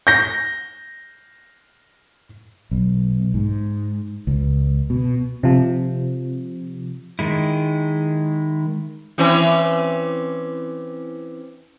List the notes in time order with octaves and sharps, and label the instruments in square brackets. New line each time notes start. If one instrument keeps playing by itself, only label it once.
[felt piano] G6 A#6
[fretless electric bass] B1
G#2
C#2
B2
[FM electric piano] C3 F3
[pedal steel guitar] D#3 G#3 E4
[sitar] E3 C4 C#4